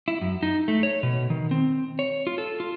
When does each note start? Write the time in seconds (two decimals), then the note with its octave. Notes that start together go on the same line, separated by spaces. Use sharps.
0.08 E4
0.22 F#2
0.43 D#4
0.68 A3
0.83 C#5
1.03 B2
1.30 D#3
1.51 C4
1.99 C#5
2.27 F4
2.38 A4
2.60 F4